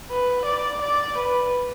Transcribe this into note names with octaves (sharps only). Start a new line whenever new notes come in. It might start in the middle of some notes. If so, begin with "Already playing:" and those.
B4
D5
D5
B4